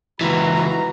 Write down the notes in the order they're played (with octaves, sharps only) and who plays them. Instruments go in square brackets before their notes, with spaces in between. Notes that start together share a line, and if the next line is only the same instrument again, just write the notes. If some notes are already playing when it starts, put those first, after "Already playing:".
[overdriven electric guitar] C#2 E3 [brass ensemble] F#4 B4 A#5